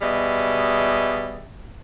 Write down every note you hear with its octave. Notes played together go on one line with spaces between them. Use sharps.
B2 G3 G#4 D#5 E5